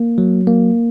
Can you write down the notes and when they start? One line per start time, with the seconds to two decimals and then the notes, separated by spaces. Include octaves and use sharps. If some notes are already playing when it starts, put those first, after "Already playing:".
Already playing: A#3
0.18 F#3
0.47 A#3